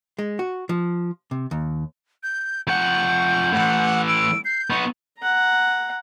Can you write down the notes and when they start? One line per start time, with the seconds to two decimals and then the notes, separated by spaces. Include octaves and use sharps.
0.19 G#3
0.39 F#4
0.69 F3
1.31 C3
1.51 D#2
2.23 G6
2.67 F2 F#5 C#6 G6
3.53 A2 E3 F#5
4.08 E6 D7
4.45 G6 C7
4.70 B3 D#4 C#6
5.18 F#5 A#5